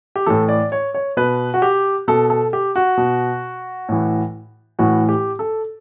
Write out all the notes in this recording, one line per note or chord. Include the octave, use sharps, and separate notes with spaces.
G4
A2 E3 A4
D5
C#5
C#5
B2 B4
F#4
G4
B2 A4
A4
G4
F#4
B2
A2 E3
A2 E3 F#4
G4
A4